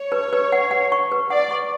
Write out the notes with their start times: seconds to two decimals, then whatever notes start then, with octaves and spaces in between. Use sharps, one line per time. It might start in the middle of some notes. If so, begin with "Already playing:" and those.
Already playing: C#5
0.12 B4
0.33 B4
0.52 F#5
0.71 F#5
0.92 C#6
1.12 B4
1.30 D5 F#5
1.51 C#6